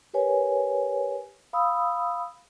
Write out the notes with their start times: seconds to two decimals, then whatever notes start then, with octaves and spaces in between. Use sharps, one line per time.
0.14 G4 A#4 B4 C#5 G#5
1.53 F5 B5 D#6 E6